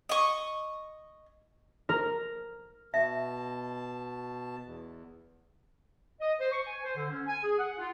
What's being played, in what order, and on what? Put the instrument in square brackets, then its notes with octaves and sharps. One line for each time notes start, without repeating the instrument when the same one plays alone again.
[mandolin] D#5 C#6
[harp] A#4
[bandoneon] B2 A5 [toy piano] E5
[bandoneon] E2
[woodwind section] D#5
C5
C#6
G#5
C5
D3
C#4
G#5
G#4
F#5
F4